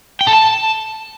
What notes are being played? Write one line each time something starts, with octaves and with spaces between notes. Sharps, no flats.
G5
A4
A5